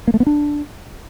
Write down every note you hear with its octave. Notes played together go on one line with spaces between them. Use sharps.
A#3
A3
B3
D4